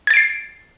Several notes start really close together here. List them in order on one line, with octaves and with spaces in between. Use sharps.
G#6 A6 D7 C7